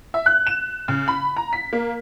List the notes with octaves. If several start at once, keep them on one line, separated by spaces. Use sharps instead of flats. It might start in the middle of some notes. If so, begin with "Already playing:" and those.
E5
F#6
E7
C#3
B5
A#5
B6
A#3